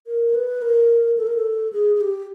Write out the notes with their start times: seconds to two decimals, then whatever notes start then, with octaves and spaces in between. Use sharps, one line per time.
0.07 A#4
0.34 B4
0.62 A#4
1.17 A4
1.27 A#4
1.36 A4
1.73 G#4
1.95 G#4
2.01 G4